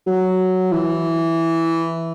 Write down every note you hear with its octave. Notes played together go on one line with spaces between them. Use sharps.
F#3
E3